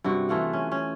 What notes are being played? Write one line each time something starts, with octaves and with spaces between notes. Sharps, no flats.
G2 C3 F#4
E3 A3 F4 F#5
C#4
C#4